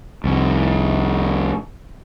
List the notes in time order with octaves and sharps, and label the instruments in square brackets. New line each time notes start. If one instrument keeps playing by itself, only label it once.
[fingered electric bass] C2 F2